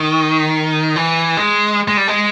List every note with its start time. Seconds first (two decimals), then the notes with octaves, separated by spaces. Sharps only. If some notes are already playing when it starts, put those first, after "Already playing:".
Already playing: D#3
0.96 E3
1.37 G#3
1.88 G#3
1.97 G3
2.08 G#3